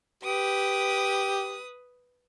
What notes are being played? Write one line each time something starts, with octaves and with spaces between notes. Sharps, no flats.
G4 B4 D#6